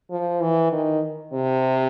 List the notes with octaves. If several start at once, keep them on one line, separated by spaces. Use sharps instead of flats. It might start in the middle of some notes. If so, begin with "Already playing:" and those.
F3
E3
D#3
C3